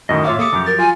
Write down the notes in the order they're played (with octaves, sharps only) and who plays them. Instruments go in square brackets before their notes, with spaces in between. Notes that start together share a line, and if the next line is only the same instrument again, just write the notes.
[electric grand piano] F#2 A2 D#3 [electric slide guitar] D#5
[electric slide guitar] A2 F4 [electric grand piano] C#5 E5 F5 [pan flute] D6
[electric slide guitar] A#3 G4 [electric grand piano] A4 D#6 C#7 [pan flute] D6
[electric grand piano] F#2 [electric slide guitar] F3 F#3 G4
[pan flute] A#4 [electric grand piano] A6
[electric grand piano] F4 [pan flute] G#5